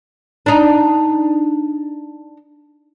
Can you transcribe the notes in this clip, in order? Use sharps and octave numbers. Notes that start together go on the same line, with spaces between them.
D4 D#4